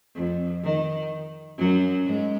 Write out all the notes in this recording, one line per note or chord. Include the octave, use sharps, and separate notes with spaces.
F2
D#3
F#2 F#3
G#2 G#3